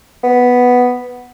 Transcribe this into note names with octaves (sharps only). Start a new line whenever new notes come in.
B3